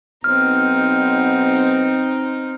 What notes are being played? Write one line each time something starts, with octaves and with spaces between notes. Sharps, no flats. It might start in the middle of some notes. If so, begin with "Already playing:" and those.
B1 B3 C4 D#4 F6